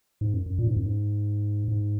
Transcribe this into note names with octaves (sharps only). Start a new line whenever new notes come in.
G#2
F#2
F#2
A#2
G#2
F#2
G#2
G#2